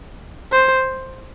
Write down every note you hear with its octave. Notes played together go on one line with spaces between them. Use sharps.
C5